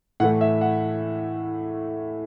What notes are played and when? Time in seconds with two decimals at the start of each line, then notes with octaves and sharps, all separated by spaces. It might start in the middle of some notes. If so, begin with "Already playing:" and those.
0.20 A2 F#5
0.23 E3 A3
0.41 E5
0.61 F#5